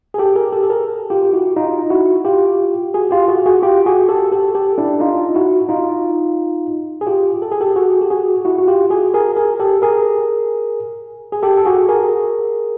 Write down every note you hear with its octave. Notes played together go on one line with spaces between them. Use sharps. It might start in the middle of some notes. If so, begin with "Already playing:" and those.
G#4
G4 A4
G#4 A#4
G4 A4
A4
G#4 A#4
F4 G4
G4
E4 F#4
D#4 F4
E4 F#4
F4 G4
F#4 G#4
F4 G4
F#4 G#4
F#4 G#4
F4 G4
F#4 G#4
G4 A4
G4 A4
G4 A4
D4 E4
D#4 F4
E4 F#4
D#4 F4
G#4
F4 G4
A4
G#4
G4 A4
F#4 G#4
G4
F#4 G#4
E4 F#4
F#4
F4 G4
F#4 G#4
G#4 A#4
G#4 A#4
G4 A4
G#4 A#4
G#4
G4 A4
A4
F#4 G#4
G#4 A#4